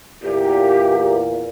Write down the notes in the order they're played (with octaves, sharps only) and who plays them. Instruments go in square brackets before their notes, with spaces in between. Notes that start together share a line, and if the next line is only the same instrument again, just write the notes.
[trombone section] E2 A#2 [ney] G4